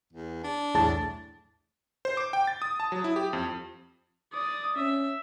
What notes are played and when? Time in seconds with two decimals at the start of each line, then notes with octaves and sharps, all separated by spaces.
0.13 E2
0.44 D4
0.75 B1 E2 A2 G#4 A5 A6
2.05 C5
2.17 D6
2.33 G5
2.47 A6
2.62 D#6
2.80 A5
2.92 F#3
3.04 E4
3.16 G4
3.33 F2
4.33 D5 D#6
4.76 C#4 E5